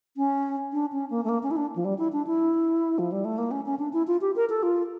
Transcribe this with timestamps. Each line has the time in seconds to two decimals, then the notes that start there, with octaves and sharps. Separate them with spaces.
0.17 C#4
0.73 D4
0.92 C#4
1.10 A#3
1.24 A3
1.29 A#3
1.43 C#4
1.51 E4
1.57 D4
1.76 F3
1.85 G3
1.98 E4
2.13 D4
2.27 E4
2.99 F3
3.12 G3
3.25 A3
3.38 A#3
3.51 C#4
3.66 C#4
3.79 D4
3.93 E4
4.07 F4
4.21 G4
4.36 A#4
4.50 A4
4.63 F4